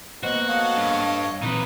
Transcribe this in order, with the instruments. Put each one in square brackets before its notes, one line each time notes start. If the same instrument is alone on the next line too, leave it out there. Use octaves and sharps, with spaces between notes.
[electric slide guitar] A#3 B3 C5 [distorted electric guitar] F#4 [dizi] D#5
[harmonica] A4 C#5 D#5 [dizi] F5
[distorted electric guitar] G2
[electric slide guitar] A#2 E3 C4 [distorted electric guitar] D#4 B4